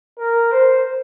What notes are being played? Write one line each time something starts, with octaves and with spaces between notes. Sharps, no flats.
A#4
C5